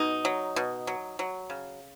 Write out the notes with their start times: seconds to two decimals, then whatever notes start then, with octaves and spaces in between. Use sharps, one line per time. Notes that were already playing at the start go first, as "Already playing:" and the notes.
Already playing: B2 D#4
0.25 F#3
0.56 B2
0.87 F#3
1.19 F#3
1.50 C#3